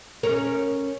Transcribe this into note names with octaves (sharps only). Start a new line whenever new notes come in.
C#4 A#4 C#5